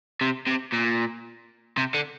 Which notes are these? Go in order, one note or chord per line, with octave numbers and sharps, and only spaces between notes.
C3
C3
A#2
C3
D3